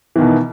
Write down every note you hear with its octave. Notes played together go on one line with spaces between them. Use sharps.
B2 D#3 E3